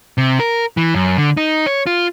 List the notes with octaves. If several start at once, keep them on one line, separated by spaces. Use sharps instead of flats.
C3
A#4
E3
F#2
D3
D#4
C#5
F4